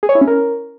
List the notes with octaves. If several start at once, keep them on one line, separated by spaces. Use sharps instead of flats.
G#4
C#5
E4
C#4
A#4